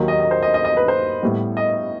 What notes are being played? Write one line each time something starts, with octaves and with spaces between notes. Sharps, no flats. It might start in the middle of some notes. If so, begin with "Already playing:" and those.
Already playing: D#2 D#3 F#3
D#5
D#5
C5
D#5
D#5
D#5
B4
C5
A2 G3 B3
D#5